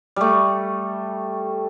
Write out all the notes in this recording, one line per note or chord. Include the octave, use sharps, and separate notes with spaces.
G3 A3